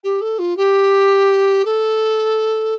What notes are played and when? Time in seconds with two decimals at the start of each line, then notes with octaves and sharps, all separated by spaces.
0.04 G4
0.21 A4
0.39 F4
0.57 G4
1.65 A4